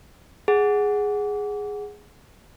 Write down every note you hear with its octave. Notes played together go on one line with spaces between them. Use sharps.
G#4 F#5